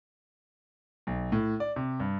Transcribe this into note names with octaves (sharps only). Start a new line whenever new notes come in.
B1
A2
D5
C3
G2